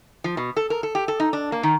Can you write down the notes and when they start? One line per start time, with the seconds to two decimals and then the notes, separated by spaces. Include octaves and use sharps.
0.24 F3
0.37 B2
0.57 A4
0.70 A#4
0.83 A4
0.95 G4
1.08 A4
1.20 D#4
1.33 D4
1.52 A#3
1.63 D#3